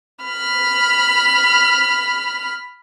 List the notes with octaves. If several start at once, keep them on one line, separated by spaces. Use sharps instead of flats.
B5 F6